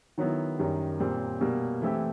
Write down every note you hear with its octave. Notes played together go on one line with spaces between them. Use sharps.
D#3 F#3 B3 E4
F#2 D#3 G3
A#2 G3 C4
B2 G3 A#3
E3 A3 C4 E4 G4